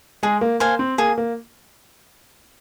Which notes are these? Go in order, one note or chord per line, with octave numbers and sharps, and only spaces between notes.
G#3 G#4
A#3
A#3 C5 F5 G#5
C4
A#3 G#4
A#3